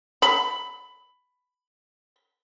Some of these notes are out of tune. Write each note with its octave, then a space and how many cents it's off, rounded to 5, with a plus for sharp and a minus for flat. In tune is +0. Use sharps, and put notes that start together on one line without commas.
B5 +10